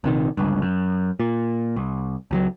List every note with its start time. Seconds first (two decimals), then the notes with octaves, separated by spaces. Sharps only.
0.04 A#1 C3 D#3
0.37 G1 C#2 G2
0.62 F#2
1.20 A#2
1.76 C2
2.31 C#2 F3 F#3